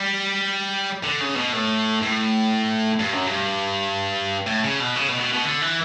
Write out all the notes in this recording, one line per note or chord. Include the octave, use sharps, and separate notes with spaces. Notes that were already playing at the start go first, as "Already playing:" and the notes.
Already playing: G3
D3
C#3
B2
A2
A2
G2
F#2
G2
A2
C#3
B2
C#3
B2
B2
B2
D3
E3